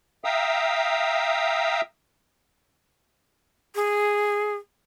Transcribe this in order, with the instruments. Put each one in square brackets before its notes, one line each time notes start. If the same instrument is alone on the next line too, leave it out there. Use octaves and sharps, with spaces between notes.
[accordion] E5 F5 G5 A#5 D#6 E6
[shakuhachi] G#4